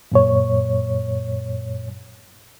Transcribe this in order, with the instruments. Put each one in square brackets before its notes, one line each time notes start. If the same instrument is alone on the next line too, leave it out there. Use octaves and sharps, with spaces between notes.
[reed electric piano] F#2 A#2 C#5